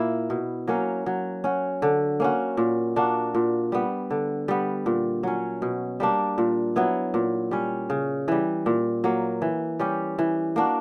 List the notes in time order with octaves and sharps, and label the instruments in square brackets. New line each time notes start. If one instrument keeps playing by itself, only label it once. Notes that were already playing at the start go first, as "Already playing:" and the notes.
Already playing: [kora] A#2 A#3 E4
B2
F#3 A#3 C#4
F#3
C#4 F#4
D3
A#3 C#4 F#4
A#2
A#3 D4 F#4
A#2
G3 B3
D3
G3 B3
A#2
F#3 C#4
B2
G3 A#3 D4
A#2
F#3 B3 E4
A#2
G3 C#4
C#3
E3 G3
A#2
F#3 A#3
E3
G3 C#4 G4
E3
A#3 D4 F#4